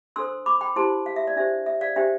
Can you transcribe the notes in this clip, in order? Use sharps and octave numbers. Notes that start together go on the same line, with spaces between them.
D4 A4 C5 C6 E6
B5 D6
G5 B5
E4 G4 C5 A5 C6
F5
E5
D5
D4 G4 C5 E5
E5
D5 F5
D4 G4 C5 E5 G5